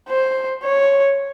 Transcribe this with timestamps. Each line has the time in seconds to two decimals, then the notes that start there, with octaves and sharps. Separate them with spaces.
0.09 C5
0.64 C#5